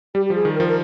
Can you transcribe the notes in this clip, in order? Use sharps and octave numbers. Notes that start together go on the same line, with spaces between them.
G3 G4
G4
F3 G#4
D#3
A#4
F3
A#4